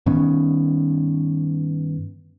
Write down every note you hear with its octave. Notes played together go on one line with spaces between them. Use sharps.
G2 D#3 B3 C#4